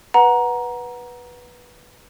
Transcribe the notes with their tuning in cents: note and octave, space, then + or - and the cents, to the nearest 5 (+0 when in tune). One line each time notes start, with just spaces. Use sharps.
B4 -10 F#5 -5 A#5 +15